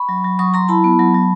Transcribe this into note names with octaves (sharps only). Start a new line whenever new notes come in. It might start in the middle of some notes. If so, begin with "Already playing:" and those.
Already playing: B5 C#6
F#3
F#3
F#3 C#6 D#6
F#3 A#5 C6
E4 A5 B5
B3
F#3
F#3